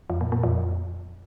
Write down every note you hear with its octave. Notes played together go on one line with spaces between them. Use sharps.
F2
A#2
A#2
F2